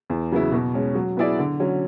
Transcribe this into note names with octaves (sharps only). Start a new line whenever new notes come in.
E2
C#3 F#3 B3 E4
B2
G#3 C#4
F#3
B3 E4 G#4 D5
D3
F#3 C#4